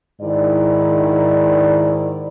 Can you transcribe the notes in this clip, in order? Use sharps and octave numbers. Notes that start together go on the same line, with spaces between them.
G#2 D#3 E4 D5